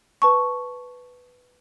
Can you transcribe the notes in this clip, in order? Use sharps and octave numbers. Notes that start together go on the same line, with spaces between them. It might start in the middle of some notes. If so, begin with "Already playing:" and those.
B4 A5 C#6